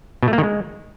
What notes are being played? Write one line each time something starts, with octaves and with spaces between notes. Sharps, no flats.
B2
A3
A#3
D#3
G#3